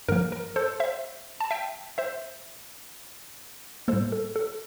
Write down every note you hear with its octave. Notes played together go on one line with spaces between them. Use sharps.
G2 D3 F3 A#3 A#4
A#4
A4 C5
C5 E5
A5
E5 G5
C5 E5
A2 G3 A#3 A4 C5
A4
A4